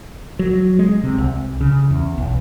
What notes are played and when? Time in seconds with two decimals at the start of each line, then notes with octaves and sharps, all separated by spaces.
0.39 F#3
0.79 G#3
1.04 C3
1.18 C2
1.61 C#3
1.91 E2
2.18 B1